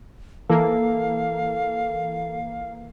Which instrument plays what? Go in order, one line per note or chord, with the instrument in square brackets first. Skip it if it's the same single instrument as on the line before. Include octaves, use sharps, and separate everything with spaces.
[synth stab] E3 A#3 [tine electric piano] A4 [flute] F5